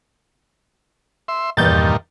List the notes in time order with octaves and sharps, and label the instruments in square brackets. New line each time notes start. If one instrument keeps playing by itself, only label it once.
[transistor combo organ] E5 C6
[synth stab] E2 G6 A6 [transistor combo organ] G2 A#2 D#3